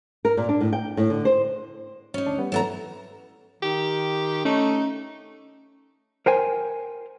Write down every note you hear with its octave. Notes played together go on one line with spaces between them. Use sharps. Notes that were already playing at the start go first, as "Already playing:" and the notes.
A#4
A#2
D4
A2
G5
A2
D3
C5
C#4 D#4
D2 D4
G3 B3
E3 F#3 A3 B3 A4 A#5
D#3 G4
A3 C#4 D#4
A#4 C5 G5 G#5